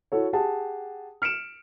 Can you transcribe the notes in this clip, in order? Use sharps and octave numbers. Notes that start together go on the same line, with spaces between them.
E4 F#4 A4 C#5
G4 G#4 F#5 A5
F6 C#7 D7 E7